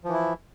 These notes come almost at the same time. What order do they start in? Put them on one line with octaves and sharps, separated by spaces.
F3 E3 E4